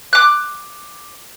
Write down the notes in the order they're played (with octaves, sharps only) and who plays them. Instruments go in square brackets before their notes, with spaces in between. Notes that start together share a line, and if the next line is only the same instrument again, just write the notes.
[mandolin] D6 F#6